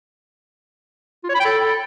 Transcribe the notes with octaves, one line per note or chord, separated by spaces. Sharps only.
F4
C#5
B5
G5
A4